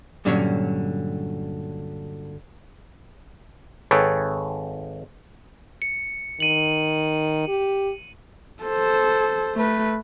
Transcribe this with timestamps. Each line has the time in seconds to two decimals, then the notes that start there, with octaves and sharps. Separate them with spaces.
0.25 G2 A#2 D3 F#3 C#4 C#5
3.91 G#1 G#4 A4 B4 C#5 G5
5.82 C#7
6.40 D#3 D#7 F#7
7.48 G4
8.63 A4 C5
9.55 A3 B4